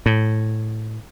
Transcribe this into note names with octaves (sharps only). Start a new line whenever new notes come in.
A2